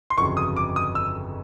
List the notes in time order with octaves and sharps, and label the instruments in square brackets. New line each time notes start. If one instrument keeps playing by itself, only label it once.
[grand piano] C6
G1 F2 C#3 F#3 C#6
D#6
D6
D#6
E6